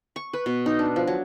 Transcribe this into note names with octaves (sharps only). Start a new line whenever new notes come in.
C#6
B4
B2
D#4
D4
F3
F#3